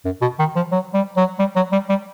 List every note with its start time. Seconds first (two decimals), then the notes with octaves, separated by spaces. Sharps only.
0.05 F#2
0.21 B2
0.39 D#3
0.56 F3
0.72 F#3
0.94 G3
1.17 F#3
1.39 G3
1.56 F#3
1.72 G3
1.89 G3